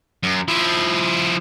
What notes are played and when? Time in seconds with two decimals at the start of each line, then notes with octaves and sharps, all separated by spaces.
0.23 F#2
0.48 F3 E4